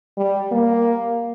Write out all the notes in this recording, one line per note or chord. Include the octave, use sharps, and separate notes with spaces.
G3
A#3